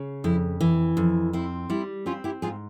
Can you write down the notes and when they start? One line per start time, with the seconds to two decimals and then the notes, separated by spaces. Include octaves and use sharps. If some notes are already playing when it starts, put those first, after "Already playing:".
Already playing: C#3
0.24 F2 E4
0.61 E3
0.97 F2
1.33 C4 E4
1.70 G3 E4
2.06 C4 C#4 F4
2.24 E4 G4
2.42 G#2 F4 G#4